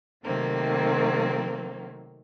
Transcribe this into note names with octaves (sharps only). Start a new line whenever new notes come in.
C3 D#3 F#3 A3 A#3 C4